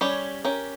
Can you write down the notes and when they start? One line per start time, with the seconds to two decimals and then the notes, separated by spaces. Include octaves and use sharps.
0.01 G3 C#4 G4 C#5
0.45 C#4 G4 A#4